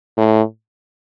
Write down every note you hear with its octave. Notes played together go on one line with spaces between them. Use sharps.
A2